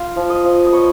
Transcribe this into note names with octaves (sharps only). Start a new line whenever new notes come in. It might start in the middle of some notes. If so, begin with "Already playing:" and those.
Already playing: F4 F5
F3
D#5
F3
D#5
B3 C#5